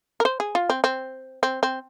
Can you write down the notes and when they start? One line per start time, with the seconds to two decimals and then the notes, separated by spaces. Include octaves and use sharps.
0.20 A#4
0.25 C5
0.40 G#4
0.55 F4
0.70 C4
0.84 C4
1.43 C4
1.63 C4